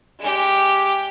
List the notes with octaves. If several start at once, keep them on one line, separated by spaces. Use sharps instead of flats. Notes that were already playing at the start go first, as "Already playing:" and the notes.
G#3 G4